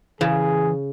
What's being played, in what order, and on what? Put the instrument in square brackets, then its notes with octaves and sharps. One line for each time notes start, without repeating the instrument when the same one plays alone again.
[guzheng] C#3 [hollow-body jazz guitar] E3 [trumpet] G#4